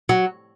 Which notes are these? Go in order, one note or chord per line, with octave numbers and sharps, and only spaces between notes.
F#3